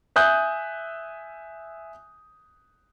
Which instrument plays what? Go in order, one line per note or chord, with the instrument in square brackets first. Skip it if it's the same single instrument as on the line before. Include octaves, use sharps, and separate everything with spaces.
[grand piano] E5 G#5 D#6 F#6 G6